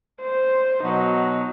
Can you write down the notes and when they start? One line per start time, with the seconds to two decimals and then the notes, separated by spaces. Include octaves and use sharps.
0.21 C5
0.83 B2 F#3 D#4